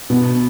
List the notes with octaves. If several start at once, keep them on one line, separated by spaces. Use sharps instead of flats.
B2 B3